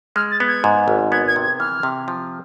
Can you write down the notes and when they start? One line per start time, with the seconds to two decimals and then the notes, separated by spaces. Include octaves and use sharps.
0.16 G#3 F6
0.31 A6
0.40 B3
0.48 G#6
0.64 G#2
0.88 G#1
1.12 B3 G#6
1.28 G#6
1.36 C3
1.44 G#6
1.60 E3 F6
1.83 C3
2.08 F3